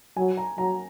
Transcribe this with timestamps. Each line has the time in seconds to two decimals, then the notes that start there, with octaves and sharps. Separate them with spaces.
0.17 F#3 G#5
0.37 A#5
0.58 F#3 A#5